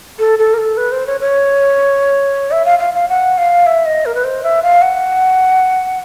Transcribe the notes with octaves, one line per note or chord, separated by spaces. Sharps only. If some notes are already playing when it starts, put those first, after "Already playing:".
A4
A4
A#4
A4
B4
C5
C#5
C#5
E5
F5
F5
F5
F#5
F5
E5
D#5
A#4
B4
C5
E5
F5
F#5